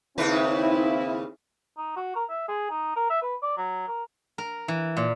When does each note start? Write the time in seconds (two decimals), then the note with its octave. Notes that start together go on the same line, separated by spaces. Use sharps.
0.18 D#2 C#3 C4 E4 B4
1.77 D#4
1.96 F#4
2.15 A#4
2.29 E5
2.48 G#4
2.70 D#4
2.96 A#4
3.10 E5
3.22 B4
3.42 D5
3.57 F#3
3.87 A#4
4.38 A#4
4.68 E3
4.97 A#2